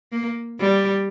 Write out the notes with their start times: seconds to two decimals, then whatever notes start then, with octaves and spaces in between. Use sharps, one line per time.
0.12 A#3
0.60 G3